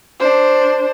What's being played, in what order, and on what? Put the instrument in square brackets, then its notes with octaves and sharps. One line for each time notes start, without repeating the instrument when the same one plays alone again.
[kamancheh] D4 C5